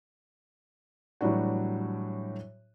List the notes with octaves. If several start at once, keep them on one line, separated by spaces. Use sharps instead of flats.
A2 E3 F#3 G3 D4 F#4